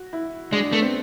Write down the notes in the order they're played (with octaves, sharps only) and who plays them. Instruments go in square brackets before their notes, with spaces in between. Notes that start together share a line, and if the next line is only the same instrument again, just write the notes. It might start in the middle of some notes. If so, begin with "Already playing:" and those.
Already playing: [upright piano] F#4
E4
[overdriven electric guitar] G#3 [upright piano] D4
[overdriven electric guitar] A3 [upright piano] B3
[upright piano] C4